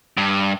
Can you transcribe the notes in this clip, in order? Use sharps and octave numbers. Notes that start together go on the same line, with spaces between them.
G2